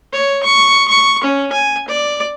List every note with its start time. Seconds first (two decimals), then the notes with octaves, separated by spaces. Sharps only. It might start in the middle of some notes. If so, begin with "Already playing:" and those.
0.13 C#5
0.43 C#6
0.88 C#6
1.24 C#4
1.53 G#5
1.88 D5